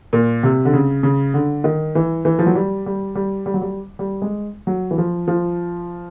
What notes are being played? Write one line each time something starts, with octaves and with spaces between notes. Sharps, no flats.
A#2
C3
D3
C#3
C#3
D3
D#3
E3
E3
F3
F#3
G3
G3
G3
G3
F#3
G3
G3
G#3
F#3
E3
F3
F3